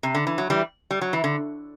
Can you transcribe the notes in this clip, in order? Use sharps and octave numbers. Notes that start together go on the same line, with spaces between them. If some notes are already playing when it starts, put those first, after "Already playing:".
C3
D3
E3
F#3
E3 G3
G3
F#3
E3
D3